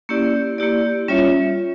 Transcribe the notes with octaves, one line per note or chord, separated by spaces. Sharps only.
A#3 C#4 E4 G4 D5
A#3 E4 G4 D5
G3 C#4 F4 C#5 E5